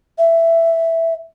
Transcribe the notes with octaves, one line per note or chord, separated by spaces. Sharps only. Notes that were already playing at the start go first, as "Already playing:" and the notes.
E5